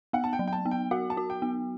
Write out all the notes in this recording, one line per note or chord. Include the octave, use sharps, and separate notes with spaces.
B3 F#5
A5
G5
F#3
G5
A5
B3
G5
F#4 F#5
A5
F#4
G5
B3